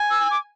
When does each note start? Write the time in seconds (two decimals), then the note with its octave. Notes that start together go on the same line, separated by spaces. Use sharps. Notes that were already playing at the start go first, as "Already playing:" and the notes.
Already playing: G#5
0.11 E6
0.31 D6